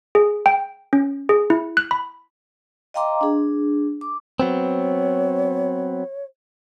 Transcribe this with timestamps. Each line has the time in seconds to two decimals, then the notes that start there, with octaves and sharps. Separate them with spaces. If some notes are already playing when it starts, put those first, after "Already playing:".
0.15 G#4
0.46 G5
0.93 C#4
1.29 G#4
1.50 E4
1.77 F#6
1.91 B5
2.94 D#5 F5 G5 A#5 C6 D6
3.21 D4 G#4
4.01 D6
4.40 F#3 B3 C4 C#5